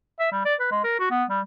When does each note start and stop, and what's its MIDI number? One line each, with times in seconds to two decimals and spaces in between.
0.20 0.28 76
0.32 0.43 55
0.45 0.54 74
0.60 0.68 71
0.71 0.80 56
0.84 0.98 70
1.00 1.08 66
1.11 1.24 59
1.29 1.40 55